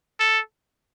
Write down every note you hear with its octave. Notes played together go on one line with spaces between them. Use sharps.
A4